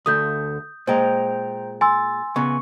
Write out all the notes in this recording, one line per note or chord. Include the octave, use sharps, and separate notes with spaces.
D2 A3 D#6 G6
A#2 G#3 C5 G5 A#5
G#5 C6 E6 A6
C#3 B3 C#6